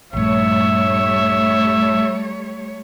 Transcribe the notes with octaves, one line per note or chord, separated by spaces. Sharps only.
A#1 G2 G3 A3 C#5 E5